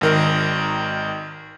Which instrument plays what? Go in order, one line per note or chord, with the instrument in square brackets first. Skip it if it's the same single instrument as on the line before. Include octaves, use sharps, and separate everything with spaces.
[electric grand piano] G#1 D#3 A#4